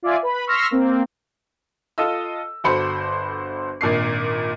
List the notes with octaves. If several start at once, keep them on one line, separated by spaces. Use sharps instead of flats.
F4 D5 E5 G#5
B4 B5
C6 C#6 E6 F6 A#6 B6
A#3 C4
F4 A4 D#5 E6
G1 F#4 A4 C5 B5 C#7
G#1 A#2 D4 C7